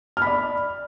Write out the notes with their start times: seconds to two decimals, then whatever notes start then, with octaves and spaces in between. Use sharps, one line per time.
0.17 F6
0.22 B5
0.27 D5